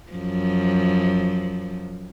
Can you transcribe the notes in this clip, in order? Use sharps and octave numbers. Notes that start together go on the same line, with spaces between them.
F#2 F3